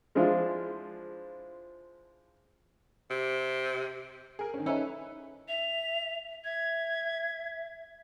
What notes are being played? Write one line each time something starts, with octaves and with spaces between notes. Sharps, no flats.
F3 G#3 D4 E4 F4
C3
G#4 A#4
D#3 C#4
C#4 D#4 E4 A4 B4 C#5 G#5
E5 F7
E5 G#6